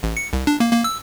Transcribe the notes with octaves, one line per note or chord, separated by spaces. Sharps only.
A1
C#7
C2
D4
A#3
A#3
E6